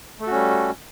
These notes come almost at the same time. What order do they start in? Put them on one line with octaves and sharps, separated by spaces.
A3 A4 F#4 C#4 G3